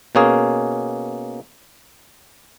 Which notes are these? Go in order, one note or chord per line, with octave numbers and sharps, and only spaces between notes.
B2 A#3 C#4 G#4